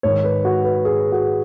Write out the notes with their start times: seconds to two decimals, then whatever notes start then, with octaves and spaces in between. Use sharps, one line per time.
0.03 G#2 D#3 C#5
0.24 B4
0.45 F#4
0.64 B4
0.85 G#4
1.12 F#4